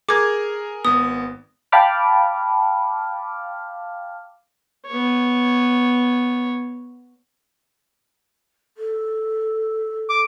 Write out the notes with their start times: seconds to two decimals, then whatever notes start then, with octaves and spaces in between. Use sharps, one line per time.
0.09 G#4 A#4 D6 G#6
0.85 G#1 B3 D#6
1.72 F5 G5 A5 B5 D6 F6
4.87 B3 C#5
8.77 A4
10.09 D6